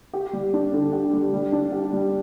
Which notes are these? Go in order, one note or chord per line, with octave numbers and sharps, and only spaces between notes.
G4
G3
D4
D3
G4
G3
G3
D4
G4
G3